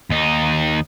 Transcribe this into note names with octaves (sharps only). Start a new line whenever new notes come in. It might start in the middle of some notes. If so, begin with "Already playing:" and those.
D#2 D#4